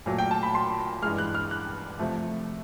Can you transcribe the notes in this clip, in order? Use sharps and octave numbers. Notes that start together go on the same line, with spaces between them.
A#2 F#3 A3
G5
A5
B5
C6
G2 E3 G#3 F6
F#6
F6
F#6
C3 F3 A3